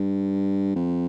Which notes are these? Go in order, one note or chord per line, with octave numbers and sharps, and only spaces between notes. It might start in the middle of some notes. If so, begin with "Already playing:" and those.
Already playing: G2
F2